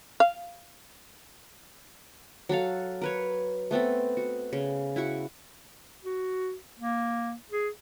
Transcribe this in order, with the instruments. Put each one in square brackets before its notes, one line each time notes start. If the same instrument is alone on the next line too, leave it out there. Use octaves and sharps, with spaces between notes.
[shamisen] F5
[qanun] F#3 F#4 A4 F5
A#4 B4 C#5
A3 B3 C4 A4
F#4
C#3
E4 F#4 C#6
[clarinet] F#4
A#3
G#4